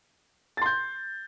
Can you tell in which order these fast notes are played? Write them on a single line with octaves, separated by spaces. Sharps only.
A6 C6 G6